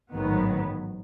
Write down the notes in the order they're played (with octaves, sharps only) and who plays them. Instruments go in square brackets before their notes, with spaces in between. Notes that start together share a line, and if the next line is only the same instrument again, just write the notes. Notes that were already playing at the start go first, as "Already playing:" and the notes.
[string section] A1 G#2 D#3 F#3 B3